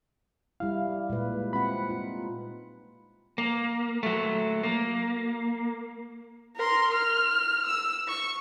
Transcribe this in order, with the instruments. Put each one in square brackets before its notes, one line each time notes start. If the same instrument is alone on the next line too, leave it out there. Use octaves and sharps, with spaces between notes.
[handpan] G3 E4 [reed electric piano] F5
[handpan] A#2 G#3 B4
[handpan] C4 F#5 [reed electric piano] B5
[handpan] D#4 F4
[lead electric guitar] A#3
F#3 A3
A#3
[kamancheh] A#4 C6
F6
E6
C#6